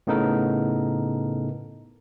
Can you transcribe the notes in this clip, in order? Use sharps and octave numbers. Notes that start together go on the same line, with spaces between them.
A2 C#3 B3 D#4 A4 A#4